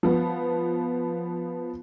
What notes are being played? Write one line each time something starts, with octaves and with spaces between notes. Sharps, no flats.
F3 B3